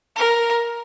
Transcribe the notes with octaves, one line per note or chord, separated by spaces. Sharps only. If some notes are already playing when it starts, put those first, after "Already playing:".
A#4